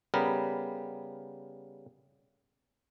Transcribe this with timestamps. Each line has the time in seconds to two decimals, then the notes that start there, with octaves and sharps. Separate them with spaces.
0.14 C#3 G3 B3 A#4